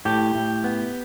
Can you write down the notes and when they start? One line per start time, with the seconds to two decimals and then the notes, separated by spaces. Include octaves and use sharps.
0.05 A2 G4
0.35 A2
0.64 B3